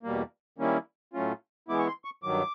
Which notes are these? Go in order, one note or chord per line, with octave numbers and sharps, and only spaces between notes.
E2 B2 G3 A#3
D#3 G3 A#3 C#4 E4
A2 F#3 A3 C#4 F4
E3 G#3 B3 E4 D6
C#6
C6
C#6
G2 D#3 F#3 D6